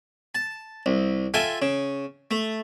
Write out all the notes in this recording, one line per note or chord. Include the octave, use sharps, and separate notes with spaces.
A5
C2
F4 A4 E5 G5 G#5
C#3
A3